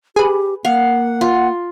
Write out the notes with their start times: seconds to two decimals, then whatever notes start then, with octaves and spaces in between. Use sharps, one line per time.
0.16 G4 G#4 B4
0.65 A#3 F5 F#5
1.21 F4